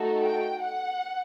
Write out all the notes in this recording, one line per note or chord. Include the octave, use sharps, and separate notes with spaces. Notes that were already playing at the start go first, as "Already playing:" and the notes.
Already playing: A3 D#4 F#4 A4
G5
F#5